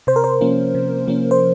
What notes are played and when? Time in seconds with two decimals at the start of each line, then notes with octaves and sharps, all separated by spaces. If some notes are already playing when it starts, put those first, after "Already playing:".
0.07 C3 C5
0.16 A#4
0.24 C5
0.41 F3 A#3 C#4
0.75 C3
1.07 F3 A#3 C#4
1.31 C5